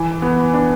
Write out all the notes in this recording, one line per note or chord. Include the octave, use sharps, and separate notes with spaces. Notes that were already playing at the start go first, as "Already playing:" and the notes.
Already playing: E3
B3
D4